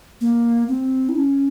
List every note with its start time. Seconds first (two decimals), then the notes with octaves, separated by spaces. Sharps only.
0.21 A#3
0.69 C4
1.09 E4
1.16 C#4